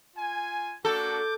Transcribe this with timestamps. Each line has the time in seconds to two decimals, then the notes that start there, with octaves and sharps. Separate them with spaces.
0.16 F4 G#5
0.85 A#3 D4 F#4 A4 D6 G6